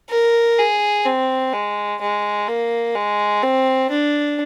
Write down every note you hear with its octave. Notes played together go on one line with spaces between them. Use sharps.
A#4
G#4
C4
G#3
G#3
A#3
G#3
C4
D4